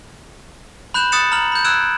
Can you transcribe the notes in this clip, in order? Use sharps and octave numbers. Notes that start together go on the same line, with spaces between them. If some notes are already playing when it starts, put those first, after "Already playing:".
B5 F#6 G6 E7 F#7
D#6 F#6 A6 C#7 E7
A#5 F6 F#7
B5 G6
E6 F#6 G#6 D7 E7